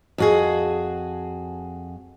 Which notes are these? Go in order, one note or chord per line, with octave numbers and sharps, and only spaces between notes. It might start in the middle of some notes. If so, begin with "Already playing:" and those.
F2 F#4 G#4